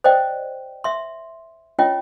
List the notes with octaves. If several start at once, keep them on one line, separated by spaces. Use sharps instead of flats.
C5 D5 D#5 G5
E5 C6
C#4 F4 C#5 D#5 G5